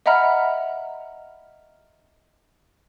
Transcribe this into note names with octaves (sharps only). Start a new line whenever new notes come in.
D#5 E5 F#5 A#5 B5 F6